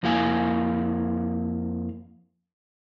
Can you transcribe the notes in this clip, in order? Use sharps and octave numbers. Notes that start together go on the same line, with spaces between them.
F2 A#3 E4 F5 G#5